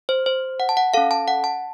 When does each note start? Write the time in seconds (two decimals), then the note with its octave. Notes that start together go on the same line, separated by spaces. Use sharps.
0.09 C5
0.26 C5
0.60 F#5
0.69 A5
0.77 F#5
0.94 C#4 A4 F5
1.11 A5
1.28 F#5
1.44 A5